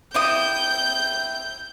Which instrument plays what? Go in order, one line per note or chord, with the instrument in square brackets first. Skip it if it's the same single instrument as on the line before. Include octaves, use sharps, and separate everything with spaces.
[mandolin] C4 E4 D#6 [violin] G6